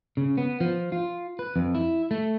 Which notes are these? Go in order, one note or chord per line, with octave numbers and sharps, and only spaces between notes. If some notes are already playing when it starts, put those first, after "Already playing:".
C#3
B3
F3
F4
B4
F2
E4
A3